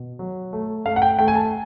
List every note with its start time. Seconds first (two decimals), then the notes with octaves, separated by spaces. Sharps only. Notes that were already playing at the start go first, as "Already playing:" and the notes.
Already playing: B2
0.19 F#3
0.53 A3
0.86 A3 F5
0.96 F#5
1.02 G5
1.19 A3 G5
1.28 G#5
1.35 A5